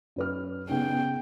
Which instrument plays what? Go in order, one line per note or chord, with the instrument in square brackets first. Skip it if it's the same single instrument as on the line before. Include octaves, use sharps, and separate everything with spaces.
[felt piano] F#2 B4 F6
[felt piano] C#3 B3 [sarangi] G5